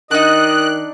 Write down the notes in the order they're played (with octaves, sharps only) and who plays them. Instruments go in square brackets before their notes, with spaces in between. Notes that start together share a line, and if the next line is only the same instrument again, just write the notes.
[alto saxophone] D#3 [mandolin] D4 D#4 [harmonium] D#5 [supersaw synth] F#6